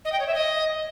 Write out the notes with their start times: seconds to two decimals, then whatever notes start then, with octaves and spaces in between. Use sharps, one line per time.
0.05 D#5
0.12 G5
0.20 C#5
0.27 E5
0.35 D#5